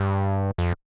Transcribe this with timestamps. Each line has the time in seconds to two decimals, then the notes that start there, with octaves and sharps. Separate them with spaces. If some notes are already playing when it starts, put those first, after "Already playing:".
Already playing: G2
0.58 F2